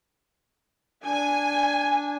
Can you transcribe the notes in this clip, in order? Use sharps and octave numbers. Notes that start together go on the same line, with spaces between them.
D4 G#5